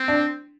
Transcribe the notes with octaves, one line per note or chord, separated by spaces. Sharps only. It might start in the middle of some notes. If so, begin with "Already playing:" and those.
Already playing: C4
D4